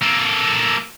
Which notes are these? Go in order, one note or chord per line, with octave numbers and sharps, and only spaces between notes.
A#3 A4